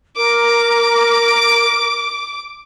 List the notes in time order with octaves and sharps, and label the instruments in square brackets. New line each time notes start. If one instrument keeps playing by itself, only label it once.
[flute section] A#4 [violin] D6